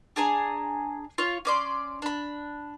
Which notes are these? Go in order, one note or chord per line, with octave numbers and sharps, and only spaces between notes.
D4 G#4 G#5 A#5
F4 C#5
C#4 D5 C6
D4 B5